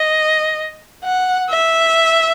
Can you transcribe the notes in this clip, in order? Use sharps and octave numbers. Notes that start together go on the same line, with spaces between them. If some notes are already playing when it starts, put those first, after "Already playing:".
Already playing: D#5
F#5
E5